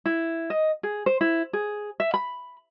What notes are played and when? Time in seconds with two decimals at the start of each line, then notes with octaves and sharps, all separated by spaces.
0.06 E4
0.50 D#5
0.83 G#4
1.06 C5
1.21 E4
1.53 G#4
2.00 E5
2.14 B5